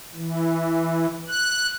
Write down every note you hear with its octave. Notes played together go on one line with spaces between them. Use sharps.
E3
F#6